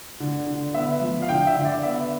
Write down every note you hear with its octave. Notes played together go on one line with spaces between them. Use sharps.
D3
D3
B3 E5
F3
F5
D3 G5
E5
D3
D5
B3 E5